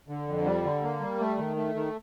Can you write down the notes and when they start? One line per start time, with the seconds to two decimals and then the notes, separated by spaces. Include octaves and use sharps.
0.08 D3
0.28 F2
0.45 G3
0.64 D3
0.83 A#3
1.00 G3
1.20 A3
1.38 D#3
1.56 A3
1.75 D#3